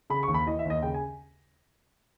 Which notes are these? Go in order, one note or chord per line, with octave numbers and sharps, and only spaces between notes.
C#3 B5
C#6
D#2
B5
E3 D#5
E5
D#2 D#5
C#3 G5
G#5